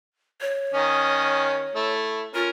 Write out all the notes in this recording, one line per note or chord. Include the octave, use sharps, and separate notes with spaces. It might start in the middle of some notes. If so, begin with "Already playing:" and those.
C#5
D#3 C#4 D#5
A3 E4
C#4 F4 A#4